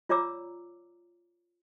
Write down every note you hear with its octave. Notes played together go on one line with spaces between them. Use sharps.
F4 C#5 D5 A#5 D6 E6